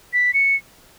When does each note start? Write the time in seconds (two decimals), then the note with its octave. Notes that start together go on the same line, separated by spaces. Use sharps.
0.13 B6
0.34 C#7